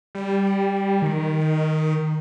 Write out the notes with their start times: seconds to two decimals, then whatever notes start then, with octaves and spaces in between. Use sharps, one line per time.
0.15 G3
1.02 D#3